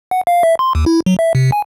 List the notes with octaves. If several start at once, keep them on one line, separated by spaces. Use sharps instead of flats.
F#5
F5
E5
C6
D#2
E4
F#3
E5
C3
G#5